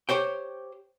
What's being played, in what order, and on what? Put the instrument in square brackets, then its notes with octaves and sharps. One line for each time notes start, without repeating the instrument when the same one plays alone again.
[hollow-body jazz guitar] G4 C5 C#5 G5